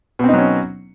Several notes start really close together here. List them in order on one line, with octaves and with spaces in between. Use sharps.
B2 C4 D#4 F#3 C#4